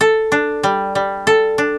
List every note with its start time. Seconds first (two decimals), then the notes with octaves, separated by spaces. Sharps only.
0.01 A4
0.32 D4
0.63 G3
0.95 G3
1.27 A4
1.58 D4